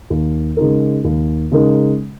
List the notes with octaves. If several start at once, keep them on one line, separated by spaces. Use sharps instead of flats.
D#2
C#3 G#3 D#4 A#4
D#2
C#3 G#3 D#4 A#4